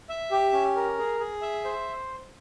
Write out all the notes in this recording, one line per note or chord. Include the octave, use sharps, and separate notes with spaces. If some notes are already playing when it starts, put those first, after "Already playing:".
E5
G4
C#4
A#4
G#4
G#4
E5
C5